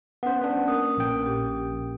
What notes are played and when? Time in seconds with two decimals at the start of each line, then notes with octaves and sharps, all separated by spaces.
0.23 B3 C#4 C5 F#5
0.42 B3 D4
0.67 A#3 C#4 A#4 D#6
0.97 A#1 G5
1.26 A#2 G4